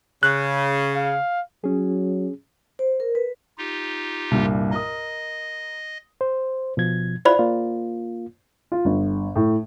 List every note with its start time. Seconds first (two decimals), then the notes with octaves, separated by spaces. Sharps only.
0.23 C#3 F#6
0.95 F5
1.64 F#3 C#4 G#4
2.79 C5
3.00 A#4
3.15 B4
3.58 D#4 F4 G4
4.31 C2 G2 A#2
4.71 A#4 D#5 D#6
6.21 C5
6.77 B2 F3 G#6
7.25 E4 F4 C5 D5 B5
7.39 A#3 F4
8.72 F4
8.85 G1
9.36 A2